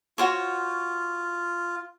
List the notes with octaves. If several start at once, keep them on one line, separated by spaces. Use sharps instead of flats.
F4 F#4 C5 C#5